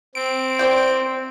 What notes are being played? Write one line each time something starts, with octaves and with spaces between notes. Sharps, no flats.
C4 D7
C5 D5 G5